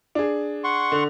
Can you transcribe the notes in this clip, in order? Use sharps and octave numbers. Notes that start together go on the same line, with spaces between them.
D4 G#4
F#5 C6 C#6
D3